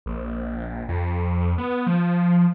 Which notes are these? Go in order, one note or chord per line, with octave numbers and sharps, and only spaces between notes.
A#1
F2
B3
F3